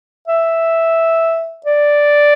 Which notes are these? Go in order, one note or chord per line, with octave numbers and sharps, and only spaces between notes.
E5
D5